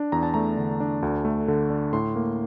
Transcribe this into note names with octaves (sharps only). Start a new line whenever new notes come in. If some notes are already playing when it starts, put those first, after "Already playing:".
Already playing: D4
E2 A#5
A5
A3 A#5
D3
D4
D2
A3
D3
D4
A2 C6
A#3